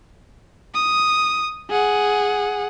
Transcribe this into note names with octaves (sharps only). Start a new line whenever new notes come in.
D#6
G#4 F#5